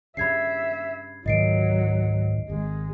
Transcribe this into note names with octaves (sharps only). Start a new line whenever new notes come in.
G2 C#3 E5 B5 G#6 C7
C#2 G#2 D#3 E3 F#3 D#5 C7 D7
G#1 G#3